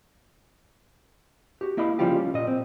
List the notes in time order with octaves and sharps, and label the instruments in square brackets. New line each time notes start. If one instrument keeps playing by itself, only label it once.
[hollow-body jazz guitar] F#4 G4
A#3 E4 D#5 F5 B5
C#3 F3 G3 F4 G4
C#4
A#2 D#5
C4